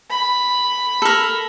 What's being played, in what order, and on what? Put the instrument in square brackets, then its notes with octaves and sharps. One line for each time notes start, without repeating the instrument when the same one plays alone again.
[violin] B5
[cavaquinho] A4 A#4